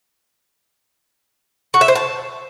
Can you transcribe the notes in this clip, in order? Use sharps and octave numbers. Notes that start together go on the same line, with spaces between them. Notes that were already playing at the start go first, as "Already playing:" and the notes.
F#4
E5
C5
A5